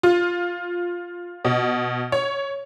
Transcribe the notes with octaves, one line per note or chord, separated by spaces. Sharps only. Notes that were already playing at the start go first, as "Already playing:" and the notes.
F4
B2
C#5